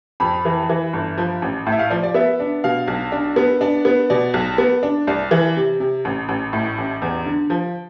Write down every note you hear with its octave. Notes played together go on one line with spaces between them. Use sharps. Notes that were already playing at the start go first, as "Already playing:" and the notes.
F2 B5
E3
E3
G1
F3
A1
A2
E5
F5
F3 D5
D5
B3 E5
D4
B2 F5
B1
D4
B3
D4 D5
B3
B2 D5
B1
B3
D4
C2 D5
E3
C3
C3
A1
A1
A2
A1
E2
D3
F3